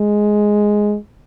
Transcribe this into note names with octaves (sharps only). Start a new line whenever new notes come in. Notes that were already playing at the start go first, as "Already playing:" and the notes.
Already playing: G#3